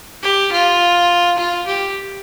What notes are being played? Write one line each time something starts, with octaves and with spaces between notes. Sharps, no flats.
G4
F4
F4
G4